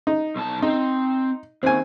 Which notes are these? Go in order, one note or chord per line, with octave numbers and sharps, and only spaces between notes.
D#4
B1 A5
C4 D#4
D#2 C4 G#5